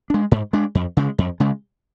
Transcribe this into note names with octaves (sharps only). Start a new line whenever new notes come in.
G#3 D4
G#2
G#3 D4
F2
C#3 G#3
F2
C#3 G#3